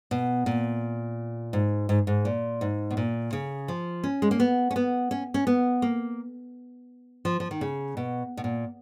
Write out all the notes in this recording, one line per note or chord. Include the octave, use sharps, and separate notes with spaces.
B2
A#2
G#2
G#2
G#2
A#2
G#2
B2
A#2
C#3
F3
C#4
G#3
A#3
B3
C#4
B3
C#4
C#4
B3
A#3
F3
F3
D#3
C#3
B2
B2
A#2